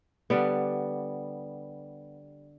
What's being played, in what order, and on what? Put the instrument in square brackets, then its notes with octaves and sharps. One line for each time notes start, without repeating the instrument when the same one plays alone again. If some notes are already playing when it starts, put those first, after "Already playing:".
[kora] D3 G3 B3